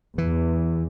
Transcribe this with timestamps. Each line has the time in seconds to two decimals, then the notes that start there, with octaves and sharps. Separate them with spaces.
0.18 E2 E3